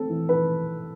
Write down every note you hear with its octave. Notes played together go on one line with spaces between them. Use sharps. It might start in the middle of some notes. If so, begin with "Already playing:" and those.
Already playing: A3 C4 A4
E3
E3 B4